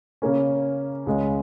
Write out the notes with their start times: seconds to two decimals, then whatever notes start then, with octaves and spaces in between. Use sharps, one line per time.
0.22 C#3 A#3 C#4
1.06 C#2 C#3 G#3 C#4